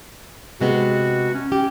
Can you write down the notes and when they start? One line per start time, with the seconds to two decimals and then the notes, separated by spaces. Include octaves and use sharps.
0.61 C3 G#3 B3 F#4
1.34 C#4
1.52 G4